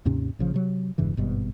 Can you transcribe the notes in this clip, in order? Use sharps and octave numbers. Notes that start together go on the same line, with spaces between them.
D#2 G#2 C3 C#4
A#1 C#3 F3
C3 F#3
E1 G2 C#3 E3
G#1 G2 B2